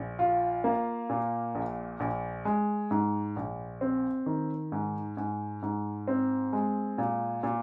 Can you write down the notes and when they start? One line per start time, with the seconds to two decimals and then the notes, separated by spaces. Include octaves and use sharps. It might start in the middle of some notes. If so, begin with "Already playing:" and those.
Already playing: A#1
0.19 F4
0.64 A#3
1.09 A#2
1.55 A#1
2.00 A#1
2.45 G#3
2.91 G#2
3.36 A#1
3.81 C4
4.26 D#3
4.72 G#2
5.17 G#2
5.62 G#2
6.08 C4
6.53 G#3
6.98 A#2
7.43 A#2